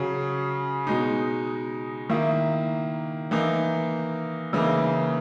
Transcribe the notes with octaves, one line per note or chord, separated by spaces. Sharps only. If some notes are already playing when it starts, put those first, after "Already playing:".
Already playing: C#3 F#3 C#4 G#4
B2 G#3 D#4
D#3 A#3 E4
E3 A#3 D#4
C#3 E3 A#3 D#4